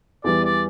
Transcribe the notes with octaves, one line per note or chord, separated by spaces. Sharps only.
E2 E3 G3 D5
D5